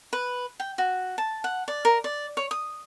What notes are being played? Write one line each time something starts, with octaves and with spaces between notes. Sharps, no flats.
B4
G5
F#4
A5
F#5
D5
A#4
D5
C#5
D#6